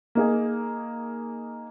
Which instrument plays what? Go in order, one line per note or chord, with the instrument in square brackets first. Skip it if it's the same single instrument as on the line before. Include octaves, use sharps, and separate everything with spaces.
[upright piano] A#3 D#4 G#4